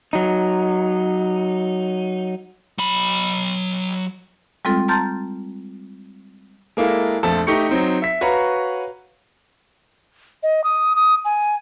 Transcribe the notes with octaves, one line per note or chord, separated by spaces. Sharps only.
F#3 D#4
F#3 B5
G3 G#3 C4 F4 A4
A5 A#5 C6 F6 G6 A6
G#3 A#3 E4 A4
A#1 F2 A3 A4 A5
A3 D#4 G4 C#6 C#7
F#3 C4 D#4
E5 B6
F#4 B4 C#5 F5 A#5
D#5
D#6
D#6
G#5